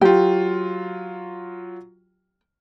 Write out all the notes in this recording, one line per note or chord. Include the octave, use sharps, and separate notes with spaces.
F#3 F4 G4 G5